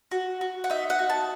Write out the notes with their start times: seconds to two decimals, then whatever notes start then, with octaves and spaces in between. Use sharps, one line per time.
0.11 F#4
0.41 F#4
0.64 F#5
0.70 D#4 E5
0.90 F#5
0.99 F#4
1.10 A5